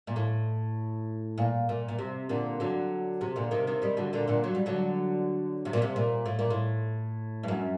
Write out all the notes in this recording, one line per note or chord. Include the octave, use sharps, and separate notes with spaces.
A#2
A2
A#2
A#2
A#2
C3
A#2 D3
D3 F#3
C3
A#2 D3
C3 D#3
C3 D#3
D#3 G3
D3 F#3
A#2 D3
A#2 D3
F#3
G3
D3 F#3
C3
A#2
C3
A#2
A2
A#2
A2
G2
F#2